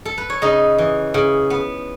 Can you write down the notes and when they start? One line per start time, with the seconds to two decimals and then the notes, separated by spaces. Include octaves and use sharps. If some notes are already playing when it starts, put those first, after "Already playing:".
0.05 A4
0.18 B4
0.30 C#5
0.42 C#3 D#4 D#5
0.78 E3
1.14 C#3
1.50 B3